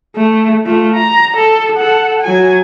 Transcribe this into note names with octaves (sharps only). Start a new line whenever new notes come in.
A3
A3 F4
A#5
A4
A4 F#5
F#3 G#5